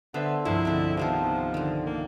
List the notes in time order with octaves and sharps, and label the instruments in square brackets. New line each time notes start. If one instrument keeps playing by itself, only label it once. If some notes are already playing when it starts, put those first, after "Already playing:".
[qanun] D3 [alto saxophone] B3 [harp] A4 C5 E5
[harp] C2 G2 F3 [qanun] G#3 [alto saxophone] E4
[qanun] D3 C4 [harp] E5
[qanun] C3 D#3 B3 [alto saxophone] F3 [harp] F5 A5
[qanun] D3 D#3
[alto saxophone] A#3